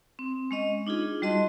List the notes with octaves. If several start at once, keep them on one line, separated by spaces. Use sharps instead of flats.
C4
G#3 C#4 D#5
D4 D#4 F4 G#4
G3 F#4 D#5 A5 C6